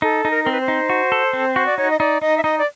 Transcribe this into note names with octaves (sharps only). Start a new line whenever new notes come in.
D#4 A4
D#4
A#4
C4 A#4
B4
C5
D#4
F#4
A4
C4
F#4
D5
D#4 C#5
D#5
D#4 D5
D#4 D#5
E5
D#4 D#5
D5